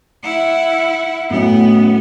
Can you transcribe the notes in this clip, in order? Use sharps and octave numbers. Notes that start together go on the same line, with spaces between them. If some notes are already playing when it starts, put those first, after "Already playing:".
E4 F#5
A2 F#3 A3 B3 C#4